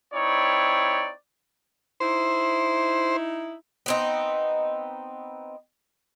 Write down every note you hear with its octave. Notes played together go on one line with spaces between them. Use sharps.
C4 D#4 E4 C#5 D5
D#4 E4 C5
B3 C4 D#4